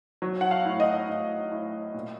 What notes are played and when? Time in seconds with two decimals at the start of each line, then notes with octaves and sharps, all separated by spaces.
0.22 F#3
0.41 F#5
0.51 F5
0.65 A2
0.80 D#5
1.09 A2
1.51 A2
1.94 A#2